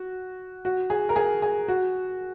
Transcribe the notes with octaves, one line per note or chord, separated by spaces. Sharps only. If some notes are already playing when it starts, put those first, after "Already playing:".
Already playing: F#4
F#4
G#4
A#4
G#4
G#4
F#4